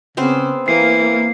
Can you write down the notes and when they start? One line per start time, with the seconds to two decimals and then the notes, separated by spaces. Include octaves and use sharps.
0.17 C#3 B3 C4 C5
0.68 E3 A#3 C7